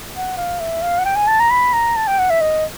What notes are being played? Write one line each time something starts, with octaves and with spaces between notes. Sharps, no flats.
F#5
F5
E5
F5
F#5
G5
G#5
A5
A#5
B5
A#5
A5
G5
F#5
E5
D#5